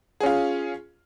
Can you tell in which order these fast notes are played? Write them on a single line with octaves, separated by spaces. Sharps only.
G#4 C#4 F4